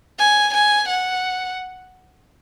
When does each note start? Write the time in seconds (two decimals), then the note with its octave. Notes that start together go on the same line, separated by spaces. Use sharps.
0.20 G#5
0.54 G#5
0.89 F#5